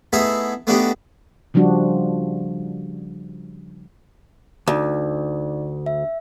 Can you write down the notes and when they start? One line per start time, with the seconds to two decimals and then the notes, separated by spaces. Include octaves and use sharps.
0.13 A3 B3 D#4 E4 G#4 E5
0.67 A3 B3 D4 D#4 F#4 G4
1.54 C#3 F3 G3 D4 F#4
4.67 D2 D#4 D5
5.86 E5